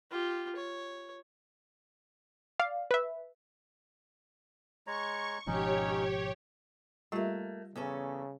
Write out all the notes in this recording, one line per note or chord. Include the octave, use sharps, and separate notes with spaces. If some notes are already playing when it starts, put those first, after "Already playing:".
F4 G4
C#5
D5 F5
B4 E5
G#3 C#5 A#5 C#6
G#1 B2 F3 C#4 D#4 G4 C#5
G3 A3 A#3 F4 G4
E2 C#3 C#4 A4